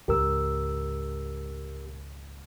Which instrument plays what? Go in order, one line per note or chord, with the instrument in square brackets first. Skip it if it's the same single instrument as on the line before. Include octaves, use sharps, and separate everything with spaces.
[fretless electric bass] C#2 G#2 G#3 [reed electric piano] G4 A#4 E6